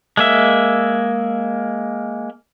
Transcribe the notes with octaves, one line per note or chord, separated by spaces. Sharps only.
G#3 A#3 E5